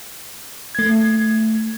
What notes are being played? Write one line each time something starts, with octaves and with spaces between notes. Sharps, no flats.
A3 G#6